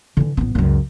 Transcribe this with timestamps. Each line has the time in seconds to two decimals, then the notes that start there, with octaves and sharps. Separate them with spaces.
0.17 D3 E3
0.37 A1 B3
0.55 C#2 F#2